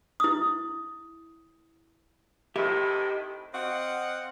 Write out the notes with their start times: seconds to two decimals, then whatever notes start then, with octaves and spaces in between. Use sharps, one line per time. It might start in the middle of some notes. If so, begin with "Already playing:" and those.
0.20 E4 D#6
2.56 A2 C3 D#3 G4 E5
3.54 C4 D#5 F5 F#5